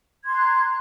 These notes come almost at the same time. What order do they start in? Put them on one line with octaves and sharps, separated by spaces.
G#6 C6 A#5 F#6